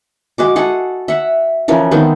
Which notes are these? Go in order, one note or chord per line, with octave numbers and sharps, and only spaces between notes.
G#3 F#4 D6
G#4 A4 F#5
E5 F#5
C#3 E3 F3 A#4
D#3 G#3 B3 C4